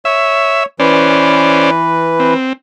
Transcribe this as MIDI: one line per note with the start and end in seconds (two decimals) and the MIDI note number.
0.05 0.65 73
0.05 0.63 76
0.80 2.34 52
0.80 1.71 61
0.80 2.34 71
0.80 1.71 72
0.80 1.71 74
2.20 2.53 60